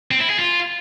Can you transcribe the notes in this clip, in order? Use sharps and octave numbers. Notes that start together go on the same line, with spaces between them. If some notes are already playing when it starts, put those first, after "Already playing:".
C4
E4
G#4
F4